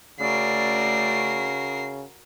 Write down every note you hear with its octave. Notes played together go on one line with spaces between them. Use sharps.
C#3 A3 C#4 F#4 A#4 D5 C7